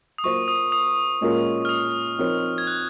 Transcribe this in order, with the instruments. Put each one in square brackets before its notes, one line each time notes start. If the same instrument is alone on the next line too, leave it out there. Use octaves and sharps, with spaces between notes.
[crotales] D#6
[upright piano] F#3 A#3 F4 C5 [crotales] C#6
[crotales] D#6
D#6
[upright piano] A#2 G#3 C#4 F4 A#4
[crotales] F6
D#6
[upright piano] F3 C4 D#4 A#4 C#5
[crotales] G#6
F#6